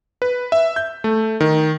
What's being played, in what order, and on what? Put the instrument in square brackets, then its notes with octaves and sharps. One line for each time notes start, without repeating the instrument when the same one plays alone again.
[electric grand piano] B4
E5
G6
A3
D#3